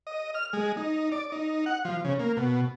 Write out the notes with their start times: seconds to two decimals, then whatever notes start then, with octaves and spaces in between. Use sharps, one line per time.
0.07 D#5
0.35 F6
0.53 G#3
0.77 D#4
1.12 D5
1.32 D#4
1.66 F#5
1.85 F3
2.04 C#3
2.19 A#3
2.37 B2